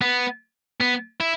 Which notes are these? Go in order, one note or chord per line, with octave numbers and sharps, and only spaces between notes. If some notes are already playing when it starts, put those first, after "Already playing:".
B3
B3
E4